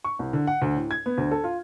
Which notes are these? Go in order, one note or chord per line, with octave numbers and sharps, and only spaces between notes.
C#6
C2
D3
F#5
D2
A2
G#6
B3
D2
A4
F4